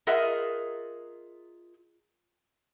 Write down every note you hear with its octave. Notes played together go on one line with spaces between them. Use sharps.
F4 G#4 A#4 D#5 E5 F#5